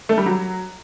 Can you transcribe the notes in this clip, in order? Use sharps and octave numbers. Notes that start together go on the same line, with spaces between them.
A3
G3
F#3